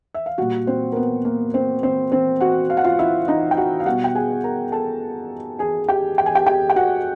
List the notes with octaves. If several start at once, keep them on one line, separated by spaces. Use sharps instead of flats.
E5
F5
A#2 G3 F#4 F#5
C4 C5
A#4
B3 B4
A#3 A#4
C4 C5
C4 C5
C4 C5
F#4 F#5
F5
F#5
F4 F5
E4 E5
D#4 D#5
G5
F#4 F#5
F5
B2 G3 F#4 F#5
G5
G#4 G#5
A#4 A#5
A4 A5
G#4 G#5
G4 G5
G5
G#5
G4 G5
G4 G5
G5
F#4 F#5